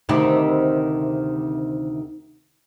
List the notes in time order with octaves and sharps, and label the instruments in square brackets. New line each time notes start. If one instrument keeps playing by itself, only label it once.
[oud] D2 C3 D#3